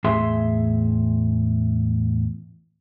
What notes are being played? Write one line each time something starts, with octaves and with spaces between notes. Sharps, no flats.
E2 A2 G#4 E5 C6